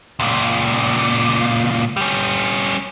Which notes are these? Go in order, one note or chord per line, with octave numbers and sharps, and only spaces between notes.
C#2 A#2
G3 C#4